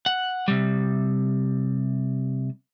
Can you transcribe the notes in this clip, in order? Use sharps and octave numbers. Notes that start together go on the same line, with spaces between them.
F#5
C3 G3